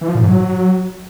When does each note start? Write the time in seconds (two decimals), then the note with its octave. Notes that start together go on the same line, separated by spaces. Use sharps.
0.01 E3
0.08 F3
0.15 A#2
0.22 G#2
0.29 F#3